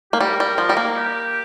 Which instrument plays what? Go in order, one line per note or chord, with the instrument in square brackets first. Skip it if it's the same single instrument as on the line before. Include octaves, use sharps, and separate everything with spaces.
[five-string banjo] A#3 [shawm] G4
[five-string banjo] G3 [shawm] A#4
[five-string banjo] G3
F3
G3
A#3
[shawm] A#4
G4